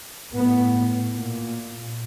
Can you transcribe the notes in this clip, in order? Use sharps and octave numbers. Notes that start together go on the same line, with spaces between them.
A2 B3
A#2